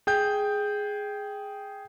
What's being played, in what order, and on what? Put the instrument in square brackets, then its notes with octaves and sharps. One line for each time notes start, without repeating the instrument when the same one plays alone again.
[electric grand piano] G#4 G5 G6